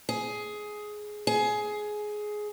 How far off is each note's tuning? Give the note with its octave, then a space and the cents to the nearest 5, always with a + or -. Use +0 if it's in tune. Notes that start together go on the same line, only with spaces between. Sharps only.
G#4 +10
G#4 +15